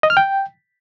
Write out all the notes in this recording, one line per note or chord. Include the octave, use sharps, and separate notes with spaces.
D#5
F6
G5